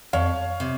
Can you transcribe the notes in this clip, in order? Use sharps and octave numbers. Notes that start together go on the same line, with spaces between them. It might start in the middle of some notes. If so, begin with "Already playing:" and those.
F2 C#5 F5
C3